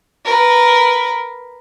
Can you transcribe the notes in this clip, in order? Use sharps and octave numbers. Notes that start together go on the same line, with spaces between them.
A#4 B4